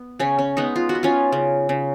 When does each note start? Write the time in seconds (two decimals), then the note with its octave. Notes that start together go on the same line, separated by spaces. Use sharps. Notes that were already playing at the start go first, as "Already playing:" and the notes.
Already playing: B3
0.19 C#3 C#4
0.39 C#4
0.57 G#3 B3 D#4
0.76 F4
0.89 F#4
0.95 B3
1.03 C#4 F4
1.32 C#3
1.69 C#3